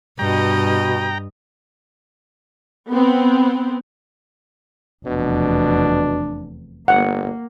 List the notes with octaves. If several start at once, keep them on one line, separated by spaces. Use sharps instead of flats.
G2 B2 D#5 G5 A#5
B3 C4
F1 E2 B2 D4
G1 A#3 F#5